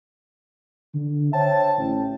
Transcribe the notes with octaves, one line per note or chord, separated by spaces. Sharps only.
D3
C5 C#5 E5 G5 A5
A1